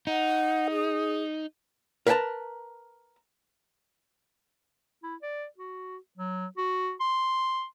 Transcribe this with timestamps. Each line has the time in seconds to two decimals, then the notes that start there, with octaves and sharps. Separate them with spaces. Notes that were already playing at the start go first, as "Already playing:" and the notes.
0.07 D#4 F#5
0.71 G#4
2.07 A#4 B4 F#5 G5 A5 A#5
5.03 E4
5.22 D5
5.58 F#4
6.18 F#3
6.57 F#4
7.00 C6